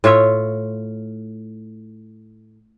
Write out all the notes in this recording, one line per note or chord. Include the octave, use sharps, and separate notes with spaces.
A2 F4 C#5 E5